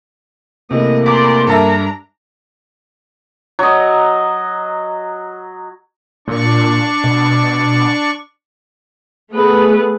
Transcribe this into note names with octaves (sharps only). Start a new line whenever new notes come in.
C3 E3 A3 A#3 D#5
E2 D5 C6 D6
G2 D4 A4 A#4 E5 A#5
F#3 D#5
A#2 D4 D5 C#6
B2
A3 B3 G#4 B4